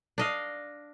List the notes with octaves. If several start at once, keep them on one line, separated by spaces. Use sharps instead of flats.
D4 D#5 F5